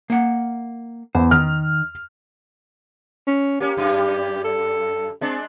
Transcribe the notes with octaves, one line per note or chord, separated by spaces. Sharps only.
A#3 F#5
E2 C5
D#3 F6
C#4
A#3 C#4 G4
F#2 G3
A4
G#3 C4 D4